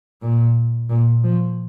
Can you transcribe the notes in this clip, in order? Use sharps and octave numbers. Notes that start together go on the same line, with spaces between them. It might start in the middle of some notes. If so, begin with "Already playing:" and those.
A#2
A#2
F3